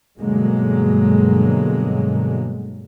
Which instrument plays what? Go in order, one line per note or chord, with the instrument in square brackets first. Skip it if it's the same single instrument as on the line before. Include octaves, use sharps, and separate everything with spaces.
[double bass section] G2 B2 D3 F#3 G#3 A#3